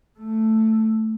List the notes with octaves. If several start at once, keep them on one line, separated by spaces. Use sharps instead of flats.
A3